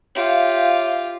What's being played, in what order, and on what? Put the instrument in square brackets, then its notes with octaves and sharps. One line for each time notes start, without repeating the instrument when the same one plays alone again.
[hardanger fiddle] F4 G4 [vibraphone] C#5 E5 F5